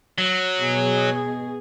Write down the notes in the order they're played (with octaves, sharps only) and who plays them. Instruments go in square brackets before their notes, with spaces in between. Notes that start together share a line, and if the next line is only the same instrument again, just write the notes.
[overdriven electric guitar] F#3
[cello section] B2 G#4